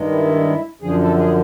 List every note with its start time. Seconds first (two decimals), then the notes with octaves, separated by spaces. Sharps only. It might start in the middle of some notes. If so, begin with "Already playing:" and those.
Already playing: G2 D#3 G#3
0.11 E4
0.82 F#2 D3 F3 G#4
1.01 A4
1.18 G#4